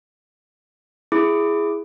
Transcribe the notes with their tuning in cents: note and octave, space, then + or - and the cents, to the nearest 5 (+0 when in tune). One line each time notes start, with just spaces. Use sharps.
E4 +15 G#4 +0 D6 +0